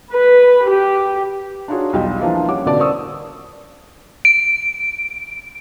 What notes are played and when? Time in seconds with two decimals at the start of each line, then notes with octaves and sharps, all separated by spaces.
0.12 B4
0.66 G4
1.68 D4 D#4 F4 F#4 G#4 C#5
1.93 B1 E2 G3 F4 G5
2.21 E3 F3 A#3 D4 E4 F4
2.48 G3 C#4 F#5 D6
2.65 A1 B2 D3 B4 D5 A5
2.79 A#4 C5 D5 C#6 D#6 E6
4.25 D7